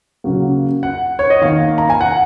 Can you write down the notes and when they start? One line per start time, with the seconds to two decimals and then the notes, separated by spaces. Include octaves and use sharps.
0.24 C#3 F#3 A#3
0.83 F#5
1.19 C#5
1.30 D#5
1.42 D#3 A#3 F5
1.78 A#5
1.90 G#5
2.01 F#5